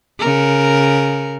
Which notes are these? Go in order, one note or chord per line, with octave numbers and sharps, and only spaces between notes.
C#3 A#4